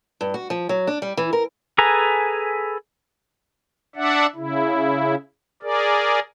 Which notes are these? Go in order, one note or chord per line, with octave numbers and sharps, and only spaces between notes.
G2
F#4
F3
F#3
D4
G3
E3
A#4
G#4 A4 B4 G#5 A#5
D4 D5 E5 F#5
C#3 E4
G#4 A#4 D5